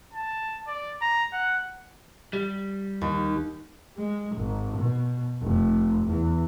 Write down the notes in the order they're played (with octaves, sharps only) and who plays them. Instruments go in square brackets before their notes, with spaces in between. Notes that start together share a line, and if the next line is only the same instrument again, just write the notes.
[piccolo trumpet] A5
D5
A#5
F#5
[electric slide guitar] G3
[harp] D#2
[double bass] G#3
G#1
B2
F1
E2